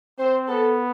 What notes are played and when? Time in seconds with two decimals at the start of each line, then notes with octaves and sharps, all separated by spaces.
0.19 C4 C5
0.48 B3 A4